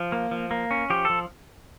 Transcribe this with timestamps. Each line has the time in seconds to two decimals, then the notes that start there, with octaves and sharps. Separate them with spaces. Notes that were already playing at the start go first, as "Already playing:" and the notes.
Already playing: F3
0.12 A#3
0.31 F3
0.51 A#3
0.71 C#4
0.90 F3 G4
1.05 F3 A4